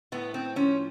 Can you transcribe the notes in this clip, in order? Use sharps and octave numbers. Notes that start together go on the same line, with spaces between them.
A2 B3
C4
F3 C#4